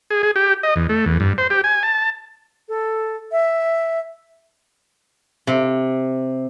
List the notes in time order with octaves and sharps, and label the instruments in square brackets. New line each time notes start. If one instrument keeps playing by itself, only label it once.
[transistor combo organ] G#4
G#4
G4
D#5
E2
A3
E2
G2
C5
G4
G#5
A5
[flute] A4
E5
[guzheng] C3